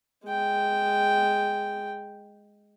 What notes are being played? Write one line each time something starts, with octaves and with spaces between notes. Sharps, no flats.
G#3 G5